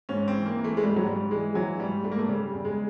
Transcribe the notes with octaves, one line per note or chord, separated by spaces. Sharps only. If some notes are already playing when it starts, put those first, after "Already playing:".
G#2 C#4
C4
E3
A#3
E3
A3
G#3
G#2 G3
F#3
G#2 G3
E3 G#3
E3 F#3
G#2 G3
G#2 A3
A#3
A3
C#3 G3
E2
G#3